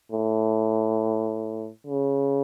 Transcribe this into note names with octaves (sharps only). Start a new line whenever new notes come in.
A2
C#3